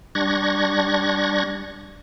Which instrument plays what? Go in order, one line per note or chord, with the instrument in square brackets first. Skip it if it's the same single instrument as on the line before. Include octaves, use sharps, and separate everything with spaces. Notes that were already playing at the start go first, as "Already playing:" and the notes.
[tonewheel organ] G3 D4 C#6 F#6 G#6 A#6